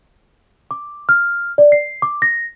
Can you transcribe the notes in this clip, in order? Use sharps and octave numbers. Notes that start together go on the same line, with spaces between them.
D6
F6
D5
C7
D6
A#6